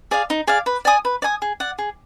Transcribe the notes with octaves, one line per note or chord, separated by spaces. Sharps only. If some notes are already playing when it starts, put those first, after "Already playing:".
G#4 D5 F5
D#4
G#4 D5 F5
B4
D5 G#5 D#6
B4
D5 G#5 D#6
G#4
D5 F#5
G#4